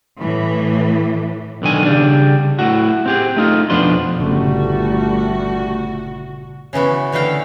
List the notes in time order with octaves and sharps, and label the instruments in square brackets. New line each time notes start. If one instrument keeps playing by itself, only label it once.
[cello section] A2 E3
[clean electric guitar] B1 D3 D#3 G#5
C#3 G3 D4
A2 F#4
C4 G4 G#4
A3 D#4 F4
F2 B2 F3 D4 B4 C6
[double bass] G1 [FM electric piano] A#2 C#3 [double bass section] G3 A3 [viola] F#4
[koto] C#3 E3 B3 F#4
D3 E3 A3 F5 G5